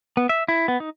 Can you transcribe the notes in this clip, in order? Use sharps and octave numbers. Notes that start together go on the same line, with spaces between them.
B3
E5
E4
B3
D#4